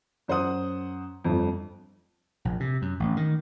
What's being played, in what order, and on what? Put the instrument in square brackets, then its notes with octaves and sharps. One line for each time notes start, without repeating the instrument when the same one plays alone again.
[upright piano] F#2 C5 F#5 D#6
G1 F2
[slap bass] A#1
C3
F#2
A1
D#3